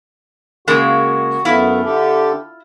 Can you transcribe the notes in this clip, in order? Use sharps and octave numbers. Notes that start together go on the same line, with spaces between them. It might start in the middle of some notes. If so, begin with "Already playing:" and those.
C#3 G#3 A#3 F#4
F#2 A3 B3 E4 F4 E5
D3 G4 A4